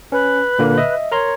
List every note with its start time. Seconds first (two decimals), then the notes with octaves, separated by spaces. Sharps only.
0.12 C#4 B4
0.59 A#2 D3 A#3
0.78 D#5 E5
1.12 A#4 C#5 A#5 C6